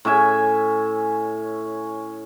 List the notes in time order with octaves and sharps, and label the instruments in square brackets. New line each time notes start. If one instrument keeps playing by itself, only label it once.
[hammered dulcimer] A2 C#4 E5 G#5